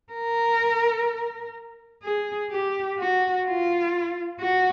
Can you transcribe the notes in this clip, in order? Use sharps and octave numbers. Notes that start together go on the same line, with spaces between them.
A#4
G#4
G4
F#4
F4
F#4